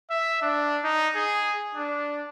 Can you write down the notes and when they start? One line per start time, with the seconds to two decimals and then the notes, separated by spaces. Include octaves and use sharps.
0.10 E5
0.42 D4
0.84 D#4
1.15 G#4
1.75 D4